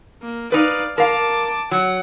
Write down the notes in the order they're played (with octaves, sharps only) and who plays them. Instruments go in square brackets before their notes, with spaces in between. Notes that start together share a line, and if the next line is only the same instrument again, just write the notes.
[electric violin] A#3
[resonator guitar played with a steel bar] D#4 B4 [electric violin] D5 F5
[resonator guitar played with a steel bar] A#4 F5 [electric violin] A5 D6
[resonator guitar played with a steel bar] F#3 [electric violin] F#5